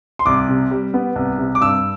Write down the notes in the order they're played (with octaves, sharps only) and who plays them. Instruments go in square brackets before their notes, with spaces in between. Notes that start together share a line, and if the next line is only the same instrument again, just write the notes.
[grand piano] C6
C2 D6
C3
G3
B3
C2
C3
D6
G2 E6